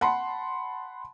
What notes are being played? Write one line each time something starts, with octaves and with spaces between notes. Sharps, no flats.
F#5 A5 B5 C6